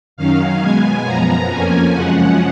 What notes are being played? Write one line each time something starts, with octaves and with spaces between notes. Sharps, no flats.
F#2 D#3 F#3 C#4 F5
B2 G#3 B3 G#5
F#2 F3 B3 A#5
F2 F3 A#3 C#4 G#5
F#2 C#3 F3 G#3 C#4 F#5